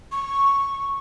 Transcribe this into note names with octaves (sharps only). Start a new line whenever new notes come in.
C#6